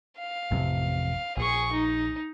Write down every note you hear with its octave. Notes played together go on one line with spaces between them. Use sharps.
F5
A1 F2 C3
A#1 G#4 C#6
D#4